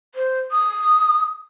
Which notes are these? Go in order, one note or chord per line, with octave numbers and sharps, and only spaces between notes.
C5
D#6